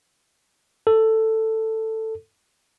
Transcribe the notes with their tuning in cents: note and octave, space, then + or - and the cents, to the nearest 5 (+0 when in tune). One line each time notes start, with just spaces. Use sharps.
A4 +10